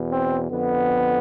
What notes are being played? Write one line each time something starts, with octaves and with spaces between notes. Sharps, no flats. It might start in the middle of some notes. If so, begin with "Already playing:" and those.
Already playing: E2 B2
C4
F2 D3 B3